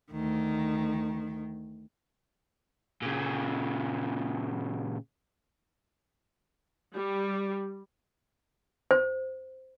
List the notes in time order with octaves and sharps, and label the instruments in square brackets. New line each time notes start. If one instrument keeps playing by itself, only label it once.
[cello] D2 D#3
[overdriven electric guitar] A#2 C#3
[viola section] G3
[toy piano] C5